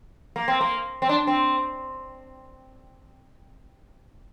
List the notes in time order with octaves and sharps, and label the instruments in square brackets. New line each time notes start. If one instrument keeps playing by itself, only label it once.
[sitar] A#3
C4
A#3
C4
D4
C4